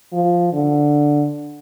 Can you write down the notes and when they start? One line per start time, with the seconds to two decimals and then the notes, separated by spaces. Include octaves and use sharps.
0.12 F3
0.53 D3